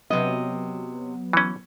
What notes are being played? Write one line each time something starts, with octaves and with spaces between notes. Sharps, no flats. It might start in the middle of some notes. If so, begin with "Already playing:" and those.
C3 F#3 B3 D#5
E3 C#4